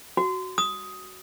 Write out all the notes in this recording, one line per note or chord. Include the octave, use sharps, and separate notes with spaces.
F#4
D#6